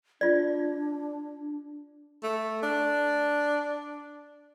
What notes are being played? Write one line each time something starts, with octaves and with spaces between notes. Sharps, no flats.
D4 F4 D5
A3
D4